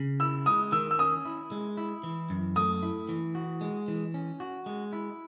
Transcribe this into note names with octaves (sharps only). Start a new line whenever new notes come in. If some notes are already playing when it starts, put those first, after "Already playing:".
Already playing: C#3
E4 E6
G#3 D#6
D#3 E6
E6
C#4 D#6
E4
G#3
E4
E3
F#2
A3 D#6
E4
E3
F#4
G#3
E3
C#4
F#4
G#3
E4